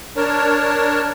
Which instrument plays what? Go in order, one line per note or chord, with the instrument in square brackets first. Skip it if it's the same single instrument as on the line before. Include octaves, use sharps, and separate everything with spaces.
[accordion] D4 A#4 C#5 A5